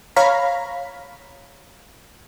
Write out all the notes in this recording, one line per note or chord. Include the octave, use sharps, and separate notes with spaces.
C#5 F5 A#5 B5